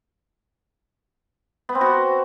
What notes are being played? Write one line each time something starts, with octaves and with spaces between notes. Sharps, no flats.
B3
C4
F#4